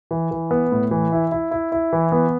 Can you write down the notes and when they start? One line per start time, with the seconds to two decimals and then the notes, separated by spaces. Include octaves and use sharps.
0.11 E3
0.31 E3
0.51 B3
0.72 A2
0.91 E3
1.12 E4
1.32 E4
1.51 E4
1.72 E4
1.93 E3
2.12 B3